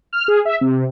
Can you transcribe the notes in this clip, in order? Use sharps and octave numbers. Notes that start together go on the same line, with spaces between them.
F6
G#4
E5
C3